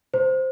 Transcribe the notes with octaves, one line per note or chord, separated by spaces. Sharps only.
C5